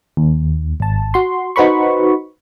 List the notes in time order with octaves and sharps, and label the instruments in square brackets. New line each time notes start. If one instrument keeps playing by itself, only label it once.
[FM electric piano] D#2
G#1 A5
F#4 C6
D#4 F#4 B4 C5 B5 C#6